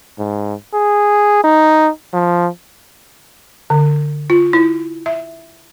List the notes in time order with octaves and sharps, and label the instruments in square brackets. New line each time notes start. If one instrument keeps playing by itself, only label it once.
[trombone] G#2
G#4
D#4
F3
[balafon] D3
F4
E4
E5